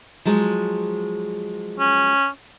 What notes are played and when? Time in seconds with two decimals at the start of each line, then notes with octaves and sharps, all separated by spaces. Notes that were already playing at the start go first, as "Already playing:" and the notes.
0.25 F3 F#3 G#3
1.79 C#4